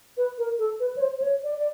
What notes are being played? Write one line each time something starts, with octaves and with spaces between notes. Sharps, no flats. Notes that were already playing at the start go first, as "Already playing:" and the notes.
B4
A#4
A4
B4
C#5
C5
C5
C#5
D5
D5